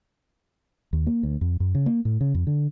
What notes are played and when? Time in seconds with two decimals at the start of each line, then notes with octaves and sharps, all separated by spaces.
0.93 D#2
1.07 A#3
1.23 D2
1.41 F2
1.60 F#2
1.75 C#3
1.86 A#3
2.05 A2
2.21 C#3
2.34 F2
2.47 D3